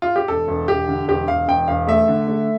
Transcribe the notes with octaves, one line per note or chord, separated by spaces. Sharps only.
F4
G4
E1 A4
E1
E1 G4
D3
E1 G4
E1 F5
E1 G5
E1 F5
A3 E5
D3
A3